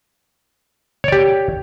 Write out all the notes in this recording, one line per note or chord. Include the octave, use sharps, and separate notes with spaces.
G4 C#5 D5